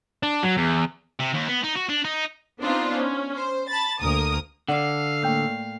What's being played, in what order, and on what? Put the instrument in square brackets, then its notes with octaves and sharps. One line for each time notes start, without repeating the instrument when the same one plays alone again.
[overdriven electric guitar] D4
F#3
E2
[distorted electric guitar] C3
D#2
B3
D#4
F#4
D4
D#4
[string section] B3 C4 D4 D#4 F4 C5
C#4
C5
A5 B5 A6
D2 A#3 A#4 D#6
[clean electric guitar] D3 [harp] D5 [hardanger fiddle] F5 [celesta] F#5
[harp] A2 A#3 [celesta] G5 G6 C7